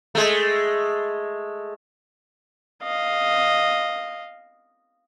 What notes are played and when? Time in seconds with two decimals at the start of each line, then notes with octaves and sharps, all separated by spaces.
0.15 G#3 A3
2.83 D#5 F5